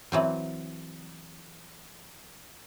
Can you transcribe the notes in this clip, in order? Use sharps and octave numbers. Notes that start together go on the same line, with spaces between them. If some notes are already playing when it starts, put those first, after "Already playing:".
E3 F#3 C4